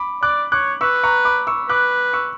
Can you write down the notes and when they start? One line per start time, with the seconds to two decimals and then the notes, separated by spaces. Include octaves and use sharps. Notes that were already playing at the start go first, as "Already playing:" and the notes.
Already playing: B5 D6
0.23 D5 D6 F#6
0.52 C#5 D6 F#6
0.81 B4 C#6 E6
1.03 A#5 C#6
1.25 B5 D6
1.47 C#6 E6
1.69 B4 D6 F#6
2.13 C#6 E6